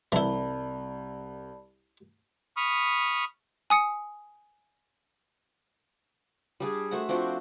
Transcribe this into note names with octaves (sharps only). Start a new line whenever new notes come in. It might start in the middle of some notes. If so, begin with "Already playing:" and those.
C2 E3 E4 D5 A5 B5 G7
B5 C#6 D#6 F6
G#5 D#6 C#7
G3 D4 G#4
A3 F#4 C5 F#5
F3 C4 D4 F#4